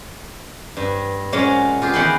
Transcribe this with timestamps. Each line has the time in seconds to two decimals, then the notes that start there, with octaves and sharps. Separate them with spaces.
0.77 G2
1.32 A#2 F#3 G#3 C#4 F4
1.82 F4 G4 G#4
1.94 E2 D#3 F#5 G5 B5 C6